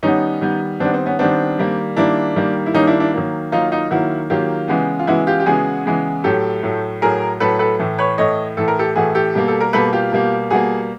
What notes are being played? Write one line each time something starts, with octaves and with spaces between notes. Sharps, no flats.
D#3 G3 B3 C#4 D#4
D#3 G3 B3
D#3 G3 B3 C4 D4
C4
B3 C#4
D#3 G3 B3 C4 D4
D#3 G3 A#3
D#3 G3 A#3 D4 E4
D#3 G3 A#3
E4
D#3 G3 A#3 C#4 D#4
D4 E4
D4 E4
D#3 F#3 A#3
D#3 F#3 A#3 D#4 F4
D#4 F4
D#3 F#3 A#3 E4 F#4
D#3 F#3 A#3 F4 G4
C#3 E3 G#3 B3
F4
C#3 E3 G#3 B3 E4 F#4
F4 G4
G4
C#3 E3 G#3 B3 F#4 G#4
C#3 E3 G#3 B3
A2 F#3 A3 G4 A4
A2 F#3 A3
A2 F#3 A3 G#4 A#4
A2 F#3 A3 A4 B4
A4 B4
A2 E3 A3
B4 C#5
A2 E3 A3 C#5 D#5
A2 E3 A3 A4
A#4
G4 A4
A2 E3 A3 F#4 G#4
G4 A4
B2 G3 A#3
A4
A#4
B2 G3 A#3 A4 B4
F4 G4
B2 G3 A#3
B2 G3 A#3 F#4 G#4